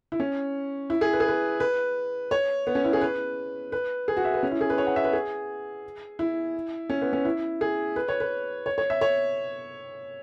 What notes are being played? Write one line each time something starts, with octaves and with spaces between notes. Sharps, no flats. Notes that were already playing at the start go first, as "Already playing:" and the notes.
E4
C#4
E4
G#4
B4
G#4
B4
B4
C#5
B3
C#4
E4
G#4
B4
B4
G#4
F#4
E5
B4
C#4
E4
G#4
B4
C#5
F#5
E5
B4
G#4
E4
C#4
B3
C#4
E4
G#4
B4
C#5
B4
C#5
C#5
E5
C#5